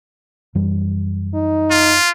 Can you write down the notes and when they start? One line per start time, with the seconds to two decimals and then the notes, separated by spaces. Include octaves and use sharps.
0.55 F#2 E3 G3
1.34 D#4
1.71 F4